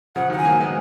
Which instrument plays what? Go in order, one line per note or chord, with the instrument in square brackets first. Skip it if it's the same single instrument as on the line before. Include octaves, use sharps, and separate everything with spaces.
[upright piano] C#3 F3 [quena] F#5
[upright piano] D#3 F#3 [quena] F#5
[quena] G#5
[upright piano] F#3 A#3
G#3 B3